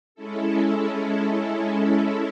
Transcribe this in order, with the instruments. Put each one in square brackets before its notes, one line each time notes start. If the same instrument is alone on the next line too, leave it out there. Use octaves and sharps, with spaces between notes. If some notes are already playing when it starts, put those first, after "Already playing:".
[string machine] G#3 C#4 E4 A4